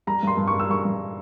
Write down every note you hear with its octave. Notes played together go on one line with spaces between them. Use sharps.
G3 A#5
G2 C6
G2
C#6
G3
E6
G3 C#6
G2